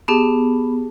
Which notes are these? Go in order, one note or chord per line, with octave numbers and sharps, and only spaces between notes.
B3 G4 G#4 A5